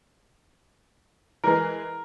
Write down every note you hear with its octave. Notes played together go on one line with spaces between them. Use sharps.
E3 G#3 G#4 A#4